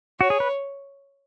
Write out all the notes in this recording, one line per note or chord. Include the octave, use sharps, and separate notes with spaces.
F#4 C#5
G#4
B4